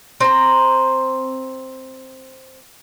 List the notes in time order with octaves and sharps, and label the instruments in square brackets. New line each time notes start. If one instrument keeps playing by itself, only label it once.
[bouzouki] C4 A#5